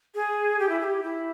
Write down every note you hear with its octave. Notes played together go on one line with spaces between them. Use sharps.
G#4
G4
E4
G#4
G4
E4